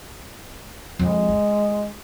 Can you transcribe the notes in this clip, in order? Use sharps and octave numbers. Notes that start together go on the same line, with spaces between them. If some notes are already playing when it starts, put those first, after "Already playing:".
F2 G#3
E4